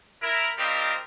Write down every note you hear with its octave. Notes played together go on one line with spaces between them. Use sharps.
E4 A#4
G3 C4 F4 G4 A#4 D#5